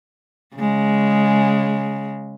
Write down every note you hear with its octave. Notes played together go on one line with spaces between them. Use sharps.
C#3 G#3